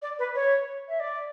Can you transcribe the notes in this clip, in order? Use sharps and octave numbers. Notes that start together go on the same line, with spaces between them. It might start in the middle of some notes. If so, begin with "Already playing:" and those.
D5
B4
C#5
E5
D5